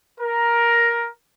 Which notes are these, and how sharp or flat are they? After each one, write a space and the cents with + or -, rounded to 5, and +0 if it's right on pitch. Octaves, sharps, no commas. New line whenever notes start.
A#4 +10